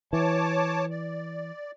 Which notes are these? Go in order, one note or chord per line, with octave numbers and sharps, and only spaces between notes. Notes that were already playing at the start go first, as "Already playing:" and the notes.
E3 C#5 A5 D6
D5